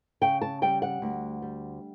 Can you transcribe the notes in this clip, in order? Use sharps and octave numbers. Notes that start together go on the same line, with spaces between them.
C#3 G5
A5
G3 G5
F#5
D2
G3